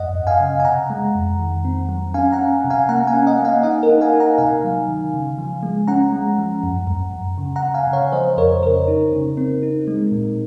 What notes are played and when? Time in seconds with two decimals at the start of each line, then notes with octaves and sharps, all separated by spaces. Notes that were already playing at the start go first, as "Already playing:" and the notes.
Already playing: F#2 D#5 F#5
0.15 F#2
0.27 F5 G#5
0.40 C#3
0.60 G#5
0.65 C3 F#5 A#5
0.90 G#3
1.15 F2
1.40 D#3
1.65 C4
1.89 F#3
2.14 C#4 F5 G#5
2.32 F#5 A#5
2.39 C#4
2.64 C3
2.70 F5 G#5
2.89 A#3 F#5 A#5
3.07 F5 G#5
3.14 C#4
3.27 D#5 F#5
3.39 A#3
3.45 F5 G#5
3.63 D#4 D#5 F#5
3.83 A#4
3.89 D#4
4.01 F5 G#5
4.14 D#4
4.20 F#5 A#5
4.38 C3 F5 G#5
4.64 F#3
4.88 D#3
5.14 C#3
5.38 F3
5.63 G#3
5.88 C#4 F#5 A#5
6.12 G#3
6.38 F3
6.63 F#2
6.87 F#2
7.13 F#2
7.38 C#3
7.56 F#5 A#5
7.63 C#3
7.75 F5 G#5
7.87 C#3
7.93 C#5 F5
8.12 F3 C5 D#5
8.37 F2 A#4 C#5
8.62 C#3 A#4
8.88 D#4
9.13 C#3
9.37 C4
9.63 D#4
9.87 G#3
10.12 A#2